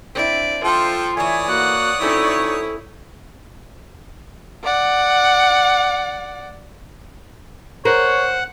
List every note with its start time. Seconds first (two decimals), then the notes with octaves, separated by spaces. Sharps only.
0.15 C4 D4 E4 D5
0.64 F3 F4 A4 G5 C6
1.17 E3 A3 C#5 D5 G#5 D#6
1.48 A#3 F#4 F#5
2.01 D2 C4 C#4 D#4 E4 A4 C#6
4.63 D5 F#5
7.85 A#4 C5 C#5 F#5